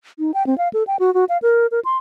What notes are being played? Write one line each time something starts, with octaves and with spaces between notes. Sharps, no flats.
D#4
G5
C4
F5
A4
G5
F#4
F#4
F5
A#4
A#4
C6